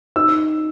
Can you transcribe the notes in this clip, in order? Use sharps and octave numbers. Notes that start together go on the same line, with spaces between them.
D#4 E6